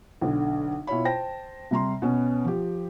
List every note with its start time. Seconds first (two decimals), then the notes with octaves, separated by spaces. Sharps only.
0.21 B1 D3 D4
0.87 B2 E4 F4 C#5 B5
1.05 C5 G5 A5 A#6
1.71 C3 G3 A#5 C6
2.02 B2 B3 C#4
2.45 F3 G4